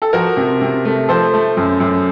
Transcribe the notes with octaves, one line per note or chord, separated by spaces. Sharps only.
A4
F3 F#4 A#4
C3
C3
A3
F3 A4 C5
A3
F#2
F#2